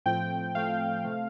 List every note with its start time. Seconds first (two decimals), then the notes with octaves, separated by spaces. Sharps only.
0.06 A2 F3 A3 C4 G5
0.55 A2 F3 A3 C4 F5
1.04 C3 A3 C4